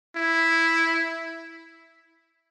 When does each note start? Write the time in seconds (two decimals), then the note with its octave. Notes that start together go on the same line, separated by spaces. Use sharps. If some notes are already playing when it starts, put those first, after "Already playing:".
0.16 E4